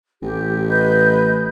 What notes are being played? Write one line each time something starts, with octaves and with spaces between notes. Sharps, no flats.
A1 G4
B4 D#5 G6